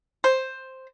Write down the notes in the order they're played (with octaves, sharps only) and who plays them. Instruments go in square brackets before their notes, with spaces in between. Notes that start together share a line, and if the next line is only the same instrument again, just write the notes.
[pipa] C5